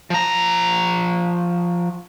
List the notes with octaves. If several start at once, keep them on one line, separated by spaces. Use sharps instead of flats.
F3 A#5